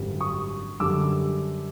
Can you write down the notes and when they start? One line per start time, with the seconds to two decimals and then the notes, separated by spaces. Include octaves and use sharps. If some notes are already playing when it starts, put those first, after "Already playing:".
Already playing: G#1 F#2 D3 G3
0.21 C#6 D#6
0.80 F#2 D3 G3 D6 E6